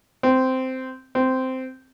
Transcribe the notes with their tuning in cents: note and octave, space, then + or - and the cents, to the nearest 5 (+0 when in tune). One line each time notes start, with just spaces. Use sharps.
C4 -10
C4 -10